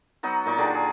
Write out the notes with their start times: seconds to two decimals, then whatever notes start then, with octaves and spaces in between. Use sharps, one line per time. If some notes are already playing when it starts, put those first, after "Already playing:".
0.23 F#3 B3 D#4 F#4
0.46 A#2 D#4 C#6 D6
0.58 D3 D#3 G#4 D5
0.75 G#4